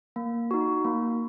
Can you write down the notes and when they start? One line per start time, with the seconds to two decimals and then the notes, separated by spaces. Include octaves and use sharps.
0.16 A#3
0.51 D#4 F#4
0.85 A#3